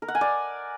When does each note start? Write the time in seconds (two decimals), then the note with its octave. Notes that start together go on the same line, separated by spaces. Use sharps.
0.02 A#4
0.08 F#5
0.15 G#5
0.21 D5